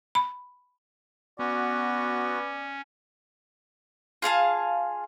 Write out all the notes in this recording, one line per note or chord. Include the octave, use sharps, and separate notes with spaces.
B5
B3 C#4 F#4 D5
F4 G#4 F5 A5